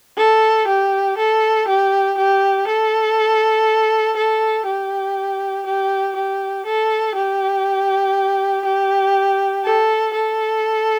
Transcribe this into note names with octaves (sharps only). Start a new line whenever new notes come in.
A4
G4
A4
G4
G4
A4
A4
G4
G4
G4
A4
G4
G4
A4
A4